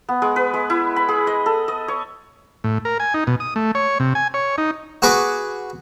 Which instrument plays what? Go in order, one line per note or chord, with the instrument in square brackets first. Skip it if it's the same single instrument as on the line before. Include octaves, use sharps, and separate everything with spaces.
[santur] B3
G#3
B4
G#3
E4
B5
G#4
D#5
A4
D#5
C#5
[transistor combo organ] A2
A#4
G#5
D#4
B2
D#6
A3
C#5
C3
G#5
C#5
D#4
[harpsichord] F#4 G#4 B4 C#6 D6